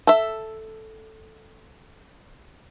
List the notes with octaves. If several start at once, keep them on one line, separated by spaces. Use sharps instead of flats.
A4 E5